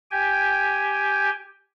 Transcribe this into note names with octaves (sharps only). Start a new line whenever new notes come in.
G4 G5 G#5